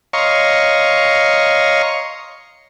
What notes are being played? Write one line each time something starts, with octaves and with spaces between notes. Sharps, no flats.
C#5 D#5 F5 A#5 C6 C#6